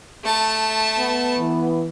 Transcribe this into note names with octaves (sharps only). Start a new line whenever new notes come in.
A3 A5
B3
E3